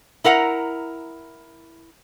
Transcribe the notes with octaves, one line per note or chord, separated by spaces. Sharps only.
E4 A#4 F#5 A#5